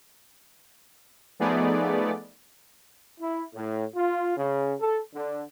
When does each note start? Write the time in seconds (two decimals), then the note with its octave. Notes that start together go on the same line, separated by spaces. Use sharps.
1.39 F3 A3 B3 D#4 G#4 D5
3.20 E4
3.54 A2
3.94 F4
4.37 C#3
4.79 A4
5.13 D3